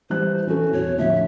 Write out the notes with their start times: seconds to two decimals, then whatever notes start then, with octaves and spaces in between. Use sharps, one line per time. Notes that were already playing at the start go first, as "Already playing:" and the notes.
0.10 E3 G3 C5 F#6
0.47 E3 C#4 F#4 A4
0.73 E2 B2 C#5
0.98 A2 D3 F3 E5